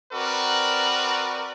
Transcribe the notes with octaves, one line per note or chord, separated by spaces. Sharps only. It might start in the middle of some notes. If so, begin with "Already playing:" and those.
C4 F#4 A#4 B4 D5